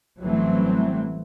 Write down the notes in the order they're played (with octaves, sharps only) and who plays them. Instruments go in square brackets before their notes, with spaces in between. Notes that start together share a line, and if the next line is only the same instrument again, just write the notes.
[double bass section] A1 E3 F#3 G3 A3 C4